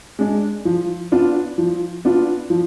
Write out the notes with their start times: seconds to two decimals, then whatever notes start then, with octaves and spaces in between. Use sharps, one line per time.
0.19 G#3 D4
0.65 F3
1.12 B3 D4 F4
1.58 F3
2.05 B3 D4 F4
2.50 F3